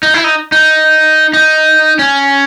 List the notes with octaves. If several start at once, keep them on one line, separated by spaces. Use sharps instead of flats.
D#4
E4
D#4
D#4
D#4
C#4